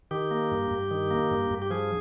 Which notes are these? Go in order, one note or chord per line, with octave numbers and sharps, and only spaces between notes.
D#3 G4
A#3
G2
G2
D#3
A#3
G2
G2
G4
F3 G#4